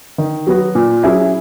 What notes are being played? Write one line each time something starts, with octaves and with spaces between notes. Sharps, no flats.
D#3
F#3 B3 F#4
A#2
F#3 C#4 E4 G#4